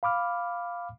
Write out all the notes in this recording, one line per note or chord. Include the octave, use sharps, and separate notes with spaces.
F5 B5 D6 F6